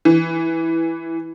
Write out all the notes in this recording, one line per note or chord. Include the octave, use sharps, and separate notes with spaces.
E3